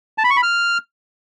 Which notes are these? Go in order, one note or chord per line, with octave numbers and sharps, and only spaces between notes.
A5
B5
C#6
B5
F6